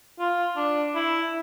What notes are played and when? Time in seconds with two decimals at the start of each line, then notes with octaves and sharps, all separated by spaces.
0.19 F4
0.57 D4
0.95 E4